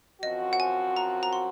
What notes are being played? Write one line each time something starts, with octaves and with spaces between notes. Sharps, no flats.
F#2 F3 C4 F#4 D#5
F#5
G#5
A#5
A#5
C6